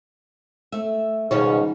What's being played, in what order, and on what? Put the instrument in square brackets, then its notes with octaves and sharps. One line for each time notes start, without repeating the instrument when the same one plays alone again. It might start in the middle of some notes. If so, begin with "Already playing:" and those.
[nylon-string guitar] A3 E5
[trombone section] C#2 G#2 [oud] B2 C#4 C#5 [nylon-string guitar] D#3 G3 F#4